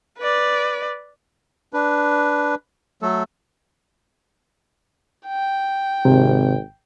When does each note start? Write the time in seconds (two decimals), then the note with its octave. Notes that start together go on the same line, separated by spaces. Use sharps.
0.19 B4 D5
1.73 D4 B4
3.02 F#3 A3 A4
5.27 G5
6.05 G#1 C3